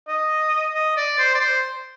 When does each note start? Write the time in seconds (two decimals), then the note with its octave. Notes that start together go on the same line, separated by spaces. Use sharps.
0.08 D#5
0.74 D#5
0.97 D5
1.19 C5
1.35 D5
1.40 C5